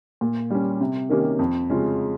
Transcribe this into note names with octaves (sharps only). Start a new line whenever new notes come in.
A#2
G3 C#4
C3
D#3 A#3 C#4 G4
F2
C#3 G#3 C#4 F4